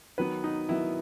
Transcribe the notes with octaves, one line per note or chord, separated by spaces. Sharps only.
D#3 F#3 B3 B4
D#4
D#3 F#3 B3 E4